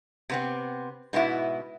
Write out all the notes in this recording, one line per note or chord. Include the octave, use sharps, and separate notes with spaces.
C3 B3 C4
G#2 B2 B3 E4